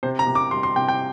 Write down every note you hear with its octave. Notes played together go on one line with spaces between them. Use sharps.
C3 C5
A#5
C3
D6
G3 C6
C6
C3 G5
G5